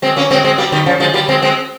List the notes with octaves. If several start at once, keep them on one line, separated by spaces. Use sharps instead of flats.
G#3 C4
A#3 C#4
G#3 C4
G#3 C4
G3 A#3
D#3 G3
C#3 F3
F3 G#3
G3 A#3
G#3 C4
G#3 C4